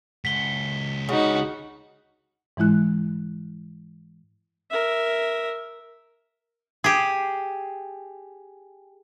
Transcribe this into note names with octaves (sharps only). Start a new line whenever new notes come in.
C#2 F#5 B6 G7
C#3 D#4 F#4
G#2 E3 G#3 E4 F#6
A#4 E5
G4 G#4